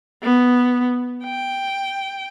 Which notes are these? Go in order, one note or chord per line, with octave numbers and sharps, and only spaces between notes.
B3
G5